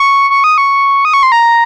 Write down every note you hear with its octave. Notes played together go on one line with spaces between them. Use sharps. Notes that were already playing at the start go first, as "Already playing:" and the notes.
Already playing: C#6
C#6
D#6
C#6
D#6
C#6
C6
A#5